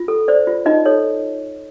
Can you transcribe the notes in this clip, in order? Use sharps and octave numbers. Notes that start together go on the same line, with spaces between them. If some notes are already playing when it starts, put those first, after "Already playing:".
Already playing: F4
A4
C5 D5
F4
D#4 F4 D#5
A4 C#5